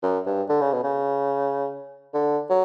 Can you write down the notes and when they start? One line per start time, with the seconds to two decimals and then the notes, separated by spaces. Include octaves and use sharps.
0.03 F#2
0.26 G2
0.49 D3
0.61 C#3
0.73 B2
0.84 C#3
2.14 D3
2.50 F#3